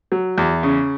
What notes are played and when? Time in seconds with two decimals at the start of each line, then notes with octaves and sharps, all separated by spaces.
0.12 F#3
0.38 E2
0.63 C#3